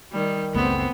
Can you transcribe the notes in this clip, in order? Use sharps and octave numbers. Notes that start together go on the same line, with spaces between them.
D#3 G3
F#1 C#2 A3 B3 C4